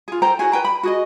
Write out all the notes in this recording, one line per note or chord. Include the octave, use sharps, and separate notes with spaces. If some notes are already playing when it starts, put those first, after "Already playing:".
F4 G#4
A4 C5 G5 A#5
E4 F#4 G#4 G#5
B4 G5 A#5
B5
F#4 G#4 D#5